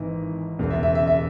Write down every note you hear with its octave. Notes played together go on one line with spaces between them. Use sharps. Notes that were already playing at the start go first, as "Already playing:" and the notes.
Already playing: G#1 G#2 E3
E1 E2 C#3
E5
E5
E5
E5